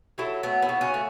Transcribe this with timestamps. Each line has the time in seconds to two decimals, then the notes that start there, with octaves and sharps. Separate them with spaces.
0.18 F#3 E4 A4
0.43 A3 B3
0.62 B3 E4
0.69 C#3
0.81 C#4 F#4
0.94 A3